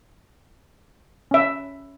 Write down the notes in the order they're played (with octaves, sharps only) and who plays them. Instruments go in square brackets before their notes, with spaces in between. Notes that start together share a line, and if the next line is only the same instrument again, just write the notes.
[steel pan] C#4 E5